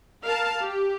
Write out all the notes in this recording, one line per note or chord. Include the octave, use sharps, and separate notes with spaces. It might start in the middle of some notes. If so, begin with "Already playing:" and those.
A#4 F5 A5
G4